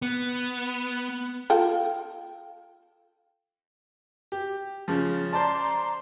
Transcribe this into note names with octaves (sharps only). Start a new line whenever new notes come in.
B3
F4 A4 G5
G4
C#3 F3
C5 D5 A5 A#5 C6 D6